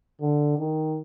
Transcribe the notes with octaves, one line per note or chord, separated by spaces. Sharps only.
D3
D#3